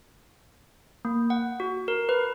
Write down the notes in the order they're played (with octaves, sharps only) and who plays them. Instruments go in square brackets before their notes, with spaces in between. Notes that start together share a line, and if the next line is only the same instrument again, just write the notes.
[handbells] A#3
F#5
F#4
A#4
B4